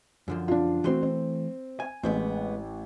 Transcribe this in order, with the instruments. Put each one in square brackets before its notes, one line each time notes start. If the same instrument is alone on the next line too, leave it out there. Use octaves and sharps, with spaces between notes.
[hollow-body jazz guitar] F#2 D3 F3
[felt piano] D4 F4
[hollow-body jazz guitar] E3 A3 C6 [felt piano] C4 F#4
[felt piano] C4
[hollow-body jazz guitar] G#5
[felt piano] A1 [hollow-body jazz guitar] G#3 B3 C4